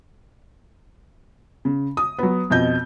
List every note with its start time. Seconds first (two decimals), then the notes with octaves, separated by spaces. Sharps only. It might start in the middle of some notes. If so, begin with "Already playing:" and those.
1.65 C#3
1.97 D#6
2.19 F#3 B3
2.50 F2 B2 D#5 G6